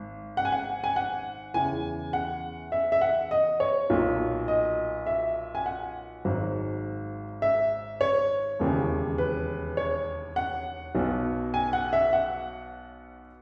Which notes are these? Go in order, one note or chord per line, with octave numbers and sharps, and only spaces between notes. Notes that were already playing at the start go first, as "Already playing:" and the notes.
Already playing: G#1
F#5
G#5
F#5
G#5
F#5
E2 C#3 E3 G#5
F#5
E5
E5
F#5
D#5
C#5
B1 A#2 F#3
D#5
E5
G#5
F#5
G#1 G#2 F#3
E5
C#5
E1 D#2 C#3 E3
B4
C#5
F#5
B1 B2 F#3
G#5
F#5
E5
F#5